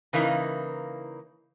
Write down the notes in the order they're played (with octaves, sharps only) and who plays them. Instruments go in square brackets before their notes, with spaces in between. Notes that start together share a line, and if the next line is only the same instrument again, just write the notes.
[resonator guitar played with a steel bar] C#3 E3 A#3 D#4